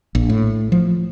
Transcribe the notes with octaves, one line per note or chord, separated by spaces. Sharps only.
A#1
A2
F3